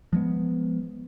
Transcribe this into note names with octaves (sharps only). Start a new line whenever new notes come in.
F3 G#3 B3